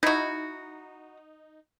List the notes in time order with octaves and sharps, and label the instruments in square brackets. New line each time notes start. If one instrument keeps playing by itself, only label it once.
[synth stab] D#4 [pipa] E4 F#4